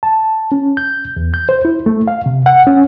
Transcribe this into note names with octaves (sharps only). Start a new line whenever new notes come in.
A5
C#4
G6
E2
G6
C5
E4
A3
F5
C3
F#5
C#4